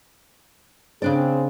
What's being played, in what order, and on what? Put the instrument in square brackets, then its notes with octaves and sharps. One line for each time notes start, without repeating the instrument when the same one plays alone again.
[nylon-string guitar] C#3 D4 D5 [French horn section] C4 G#4